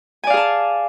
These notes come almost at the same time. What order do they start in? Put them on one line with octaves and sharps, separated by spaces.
G#5 D5 F5 G#4 A5